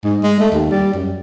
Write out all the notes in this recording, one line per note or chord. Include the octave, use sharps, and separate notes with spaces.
G#2
G#3
A3
D#2
G3
F#2